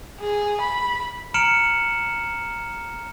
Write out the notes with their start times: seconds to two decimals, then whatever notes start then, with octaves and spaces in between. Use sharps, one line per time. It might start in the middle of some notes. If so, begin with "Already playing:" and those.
0.21 G#4
0.61 B5
1.34 A#5 F6 C#7 D7 E7 F#7